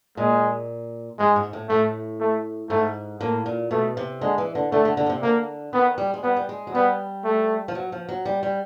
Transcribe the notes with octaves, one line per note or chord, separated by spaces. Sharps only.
A#2 G#3
G#2 G#3
G#2
A2
A2 A3
A3
G#2 A3
A2 A#3
A#2
B2 A3
C3
D3 G#3
E3
D3
D3 A3
D3
D3
C#3
C3
D3 A#3
D#3 B3
G3
G#3
G3 B3
G3
G#3
F#3
G3 B3
A3
F3
F#3
F3
F#3
G3
G3